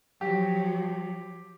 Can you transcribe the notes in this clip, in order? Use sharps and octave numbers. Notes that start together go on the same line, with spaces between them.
F3 F#3 G4